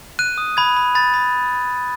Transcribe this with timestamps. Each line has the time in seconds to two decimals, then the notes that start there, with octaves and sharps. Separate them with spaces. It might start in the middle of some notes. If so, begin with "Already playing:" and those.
0.19 F#6 D#7
0.38 D#6
0.57 B5 G#6
0.77 B5
0.95 B5 A6
1.14 B5